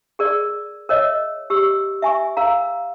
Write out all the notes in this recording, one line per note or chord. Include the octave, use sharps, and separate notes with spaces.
G#4 A#4 D5
A#4 C#5 D#5 E5
G4 E6
E5 G#5 C#6
A#4 F5 A#5